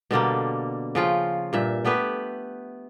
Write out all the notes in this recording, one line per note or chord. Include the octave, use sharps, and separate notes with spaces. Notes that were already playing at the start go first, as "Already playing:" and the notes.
B2 D3 G3 A#3
C#3 F3 F4 G5
G2 A#2 E5
A3 B3 G4 B4